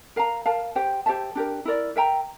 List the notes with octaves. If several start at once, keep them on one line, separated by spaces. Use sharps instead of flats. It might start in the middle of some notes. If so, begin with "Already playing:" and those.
A#4 F5 A#5
A#4 F5 A5
G4 C5 G5
G4 C5 E5 A5
D4 G4 A#4
E4 A#4 D5
A#4 E5 G5 A#5